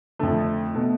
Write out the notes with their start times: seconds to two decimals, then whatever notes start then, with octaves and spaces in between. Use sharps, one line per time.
0.19 F2 D3 A3
0.75 B2 A3